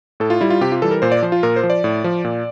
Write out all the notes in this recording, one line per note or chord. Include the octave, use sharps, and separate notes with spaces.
A2 A4
F4
G3 E4
F4
C3 G4
F4
E3 G3 A4
A#4
A#2 C5
D5
F3 C5
F4
A#2 A#4
C5
F3
D5
A2
F3
A#2